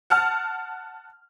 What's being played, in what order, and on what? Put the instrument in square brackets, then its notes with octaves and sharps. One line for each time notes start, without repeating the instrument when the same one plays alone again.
[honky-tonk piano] F#5 A5 F6